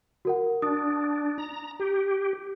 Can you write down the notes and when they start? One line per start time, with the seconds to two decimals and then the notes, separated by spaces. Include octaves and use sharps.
0.25 F#4 A#4 F#5
0.62 D4 D#6
1.38 A#5
1.80 G4